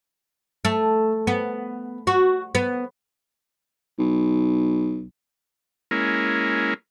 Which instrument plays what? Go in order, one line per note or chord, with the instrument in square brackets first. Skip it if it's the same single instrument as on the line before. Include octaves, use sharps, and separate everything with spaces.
[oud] A3
B3
F#4
B3
[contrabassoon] B1
[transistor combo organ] G#3 A#3 C#4 E4 A#4